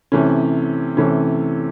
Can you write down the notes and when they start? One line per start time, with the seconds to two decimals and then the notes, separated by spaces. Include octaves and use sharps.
0.12 C3 E3 A3 C#4
0.97 C3 E3 A3 C#4